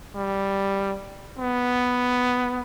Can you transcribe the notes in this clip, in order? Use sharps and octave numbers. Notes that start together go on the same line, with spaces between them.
G3
B3